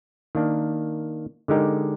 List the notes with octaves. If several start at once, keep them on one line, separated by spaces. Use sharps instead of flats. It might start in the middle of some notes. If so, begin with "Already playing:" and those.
D#3 A#3 D4
D3 G#3 D#4 G4 A#4